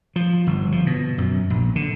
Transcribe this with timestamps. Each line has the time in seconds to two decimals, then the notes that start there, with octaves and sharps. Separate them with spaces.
0.16 F3
0.47 G1
0.72 F3
0.87 B2
1.18 F#2
1.50 A#1
1.76 D3